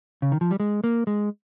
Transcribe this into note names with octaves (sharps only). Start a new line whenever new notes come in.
C#3
D#3
F3
G3
G#3
A#3
G#3